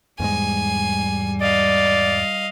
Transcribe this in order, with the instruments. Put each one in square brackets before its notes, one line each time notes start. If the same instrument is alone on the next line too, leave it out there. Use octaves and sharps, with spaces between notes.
[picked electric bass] E2 G#2 G#3 [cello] G3 [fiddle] G#5
[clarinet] D5 [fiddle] D#5 F5